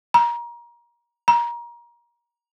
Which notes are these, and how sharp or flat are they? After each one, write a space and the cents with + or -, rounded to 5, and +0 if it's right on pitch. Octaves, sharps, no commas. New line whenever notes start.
A#5 +25
A#5 +25